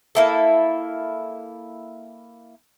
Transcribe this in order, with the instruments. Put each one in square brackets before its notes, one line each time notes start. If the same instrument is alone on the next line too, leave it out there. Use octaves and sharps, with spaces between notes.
[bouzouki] A#3 E4 A4